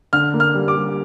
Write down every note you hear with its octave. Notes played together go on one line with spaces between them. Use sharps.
D3 F6
A#3
F6
G3
D6
G3